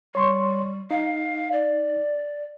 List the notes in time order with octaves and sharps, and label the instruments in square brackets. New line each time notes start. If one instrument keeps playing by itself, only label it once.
[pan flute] G3 [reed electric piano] C#5 C6 C#6
[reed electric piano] D#4 [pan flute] F5
[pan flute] D5